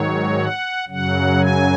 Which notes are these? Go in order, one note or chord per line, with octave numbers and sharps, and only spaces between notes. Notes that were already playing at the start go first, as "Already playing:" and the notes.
Already playing: G#2 D#3 F#3 C#5
F#5
F#2 C#3 F#3 F#5
G#5